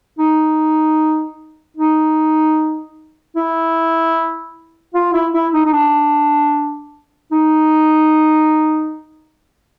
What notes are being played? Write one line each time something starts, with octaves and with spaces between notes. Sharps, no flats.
D#4
D#4
E4
F4
E4
E4
D#4
D#4
D4
D#4